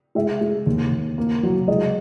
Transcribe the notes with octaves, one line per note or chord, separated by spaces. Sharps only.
G#3 E5
G#3
D#2
D#2
A#3
F#3
G#3 D#5